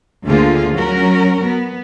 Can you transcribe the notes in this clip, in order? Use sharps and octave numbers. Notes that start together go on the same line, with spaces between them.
D2 D3 A#3 F4 G#4
F#3 C#4 F#4 A#4
B3